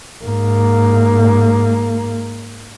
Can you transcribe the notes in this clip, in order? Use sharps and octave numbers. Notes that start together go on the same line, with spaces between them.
G#2 A#3